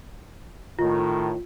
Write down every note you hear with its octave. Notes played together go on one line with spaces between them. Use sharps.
A2 D#3 F4